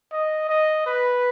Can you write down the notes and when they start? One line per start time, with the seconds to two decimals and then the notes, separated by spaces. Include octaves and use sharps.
0.12 D#5
0.49 D#5
0.86 B4